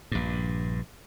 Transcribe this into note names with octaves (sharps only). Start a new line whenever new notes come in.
A#1 G2